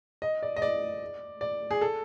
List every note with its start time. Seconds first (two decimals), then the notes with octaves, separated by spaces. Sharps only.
0.22 D#5
0.43 D5
0.56 D#5
0.62 D5
1.41 D5
1.71 G#4
1.81 A4